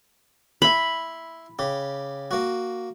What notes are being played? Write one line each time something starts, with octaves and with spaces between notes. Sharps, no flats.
E4 B5 C6
C#3 G4
A#3 F#4